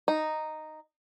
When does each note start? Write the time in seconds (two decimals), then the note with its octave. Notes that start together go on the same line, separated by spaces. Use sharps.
0.08 D#4